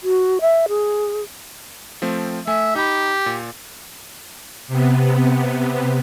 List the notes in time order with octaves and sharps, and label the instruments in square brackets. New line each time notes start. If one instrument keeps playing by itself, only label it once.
[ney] F#4
E5
G#4
[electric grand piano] F3 A3 C4
[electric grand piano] A3 G#5 [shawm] E5
[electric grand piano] D#4 B5 [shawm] G4
[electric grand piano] A#2
[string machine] C3 B3